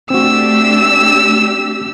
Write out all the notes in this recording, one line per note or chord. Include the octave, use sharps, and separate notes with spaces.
A3 C4 D4 F#4 G4 E6